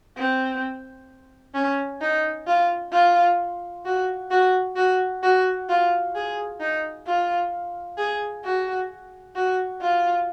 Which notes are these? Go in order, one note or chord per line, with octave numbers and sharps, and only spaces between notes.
C4
C#4
D#4
F4
F4
F#4
F#4
F#4
F#4
F4
G#4
D#4
F4
G#4
F#4
F#4
F4